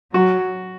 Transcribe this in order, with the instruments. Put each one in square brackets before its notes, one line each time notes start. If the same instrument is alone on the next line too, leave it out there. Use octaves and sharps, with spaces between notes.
[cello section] F#3 [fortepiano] F#4